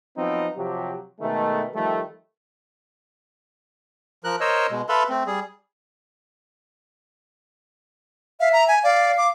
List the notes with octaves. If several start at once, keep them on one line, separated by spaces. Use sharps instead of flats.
F3 F#3 B3 C4 D#4
C3 F3 F#3 G4
B2 D#3 G#3 A3
D#3 F3 G3 A3
F3 A#4 F#6
A#4 C5 C#5 D#5 E6
B2 G#3
A4 B4 E5 F5 B5 C6
A3 C4
G3 G#4
E5 F5
A#5
G#5
D5 F5
D6